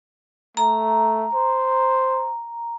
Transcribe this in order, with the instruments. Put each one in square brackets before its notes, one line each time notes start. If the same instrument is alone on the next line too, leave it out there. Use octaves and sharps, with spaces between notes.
[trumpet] A3 [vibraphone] A#5
[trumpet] C5